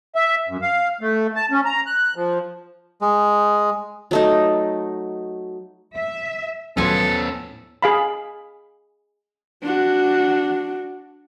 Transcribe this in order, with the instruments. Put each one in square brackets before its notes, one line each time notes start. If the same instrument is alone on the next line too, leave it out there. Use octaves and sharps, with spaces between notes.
[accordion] E5
F#2
F5
A3
A5
C#4
A#5
F#6
F3
[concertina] G#3
[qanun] F#3 A3 D#4
[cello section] E5
[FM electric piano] D#2 F#3 [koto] A2 F3 G#5 [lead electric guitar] B3 C#4 [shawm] A4
[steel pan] G#4 F5 B5
[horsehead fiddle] D4 F#4